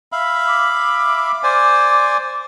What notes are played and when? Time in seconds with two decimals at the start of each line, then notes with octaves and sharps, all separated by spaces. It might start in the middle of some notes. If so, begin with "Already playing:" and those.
0.12 E5 F5 B5
0.48 D6
1.43 C5 D5 G#5